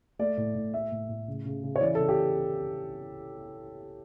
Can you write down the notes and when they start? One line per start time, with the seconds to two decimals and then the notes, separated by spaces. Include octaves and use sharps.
0.19 A3 D5
0.37 A2
0.55 A2
0.73 A3 E5
0.92 A2
1.09 A2
1.28 C#3
1.46 C#3
1.63 C#3
1.76 C#5
1.81 E3 D5
1.95 A4
1.99 C#3
2.09 G4